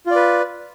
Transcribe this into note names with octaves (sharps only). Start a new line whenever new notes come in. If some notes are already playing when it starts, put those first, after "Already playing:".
F4 B4 D5